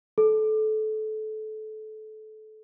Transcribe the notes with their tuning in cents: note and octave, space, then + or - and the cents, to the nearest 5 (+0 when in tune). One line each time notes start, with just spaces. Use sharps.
A4 -25